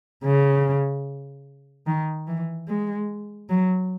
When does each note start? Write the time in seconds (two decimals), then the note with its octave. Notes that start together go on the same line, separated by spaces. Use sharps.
0.24 C#3
1.87 D#3
2.27 E3
2.68 G#3
3.50 F#3